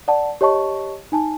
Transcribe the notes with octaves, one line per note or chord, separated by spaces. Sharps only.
D5 F#5 A5
G4 C#5 D#5 A5 C#6
D#4 G#5 A5